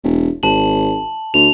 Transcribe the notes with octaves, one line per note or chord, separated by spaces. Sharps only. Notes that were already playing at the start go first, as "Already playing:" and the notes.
E1
G#1 A5 F#7
D2 F7